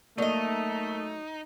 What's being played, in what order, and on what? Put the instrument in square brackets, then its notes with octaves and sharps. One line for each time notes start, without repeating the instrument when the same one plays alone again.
[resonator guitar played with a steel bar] F#3 D#5 [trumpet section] A3 [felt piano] A#3 D5 [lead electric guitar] D#4